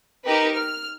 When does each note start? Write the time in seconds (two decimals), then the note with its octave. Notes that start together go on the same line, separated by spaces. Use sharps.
0.25 D#4 G4 A#4 B4
0.56 F6